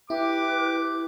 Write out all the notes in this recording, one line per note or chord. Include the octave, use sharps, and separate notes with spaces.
E4 G4 B4 D6